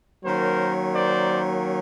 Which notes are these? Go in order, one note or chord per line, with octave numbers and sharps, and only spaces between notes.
D#3 F#3 A#3 C#4 A#4 C5
C5 D5